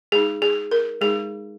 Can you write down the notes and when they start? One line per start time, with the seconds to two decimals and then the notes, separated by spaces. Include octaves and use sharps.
0.12 G#3 D#4 G#4
0.42 G#4
0.71 A#4
1.01 G#3 D#4 G#4